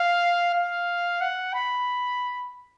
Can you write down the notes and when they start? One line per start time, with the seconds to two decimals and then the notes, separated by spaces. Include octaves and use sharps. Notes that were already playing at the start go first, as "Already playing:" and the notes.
Already playing: F5
0.54 F5
1.21 F#5
1.54 B5